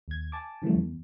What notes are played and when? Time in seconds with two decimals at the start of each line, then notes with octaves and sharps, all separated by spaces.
0.08 D#2 G#6
0.32 G#5 A5 D6
0.62 C#3 E3 F3 G3 A3
0.75 E2